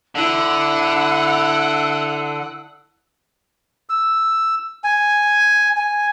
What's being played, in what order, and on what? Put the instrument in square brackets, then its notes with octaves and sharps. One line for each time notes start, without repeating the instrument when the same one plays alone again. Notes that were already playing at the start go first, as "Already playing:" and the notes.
[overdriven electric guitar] D3 [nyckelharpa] E4 [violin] F#5 [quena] E6
[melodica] E6
G#5
G#5